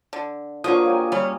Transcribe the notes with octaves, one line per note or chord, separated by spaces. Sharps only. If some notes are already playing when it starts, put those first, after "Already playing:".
D3
D3 F3 F#3 A#3 F4 A#4 C#5 D#6
A#3 G4 G#5
G3 C#4